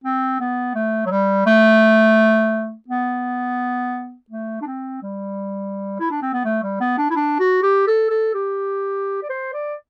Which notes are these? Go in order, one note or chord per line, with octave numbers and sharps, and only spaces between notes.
C4
B3
A3
F#3
G3
A3
B3
A3
D4
C4
G3
E4
D4
C4
B3
A3
G3
B3
D4
E4
D4
F#4
G4
A4
A4
G4
D5
C5
D5